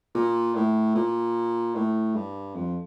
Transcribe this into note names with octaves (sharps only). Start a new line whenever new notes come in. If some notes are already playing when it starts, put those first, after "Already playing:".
A#2
A2
A#2
A2
G2
F2